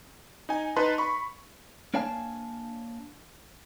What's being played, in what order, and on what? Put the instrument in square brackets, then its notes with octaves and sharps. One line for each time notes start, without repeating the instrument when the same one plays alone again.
[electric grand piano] D#4 G#5
D#4 B4 A5 C6
B5 C#6
[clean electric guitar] A#3 D4 C#5 F5 G#5 A5